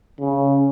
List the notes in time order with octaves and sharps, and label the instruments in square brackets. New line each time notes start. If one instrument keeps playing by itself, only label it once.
[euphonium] C#3